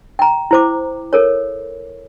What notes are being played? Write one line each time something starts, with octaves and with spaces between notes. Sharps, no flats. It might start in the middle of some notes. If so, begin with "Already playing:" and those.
G5 A#5
E4 C5 D6
A4 A#4 C#5